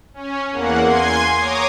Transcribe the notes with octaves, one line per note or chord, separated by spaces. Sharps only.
C#4
E2 A#3 F#5
G#5 C6 G#6
C#5 A#5 D6 D#6